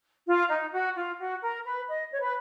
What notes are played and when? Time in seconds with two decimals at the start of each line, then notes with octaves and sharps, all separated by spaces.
0.27 F4
0.50 D#4
0.73 F#4
0.95 F4
1.19 F#4
1.42 A#4
1.65 B4
1.88 D#5
2.11 C#5
2.21 B4